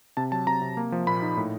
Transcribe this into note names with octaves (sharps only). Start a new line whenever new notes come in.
C3 A5
F#3 A5
C3 A#5
C3
A#3
F3
A#2 B5
D#4
A2